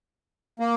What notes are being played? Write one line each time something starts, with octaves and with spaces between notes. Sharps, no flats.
A#3